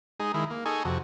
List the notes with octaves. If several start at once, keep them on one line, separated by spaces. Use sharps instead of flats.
G#3 D#4 G#4
D#3 G#3 E4
A#3
D#4 G#4 A4 G#5 C#6
F2 C3 F#4